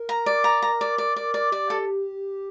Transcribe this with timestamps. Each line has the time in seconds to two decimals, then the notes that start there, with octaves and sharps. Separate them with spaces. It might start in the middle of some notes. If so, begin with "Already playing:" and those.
Already playing: A#4
0.09 A#5
0.26 D5
0.44 A#5
0.62 A#5
0.81 D5
0.98 D5
1.16 D5
1.34 D5
1.52 G4 D5
1.70 A4